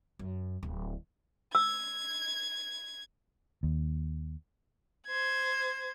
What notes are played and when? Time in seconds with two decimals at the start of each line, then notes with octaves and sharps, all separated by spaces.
0.19 F#2
0.63 D1
1.55 E6 G#6
3.63 D#2
5.07 C5 G#6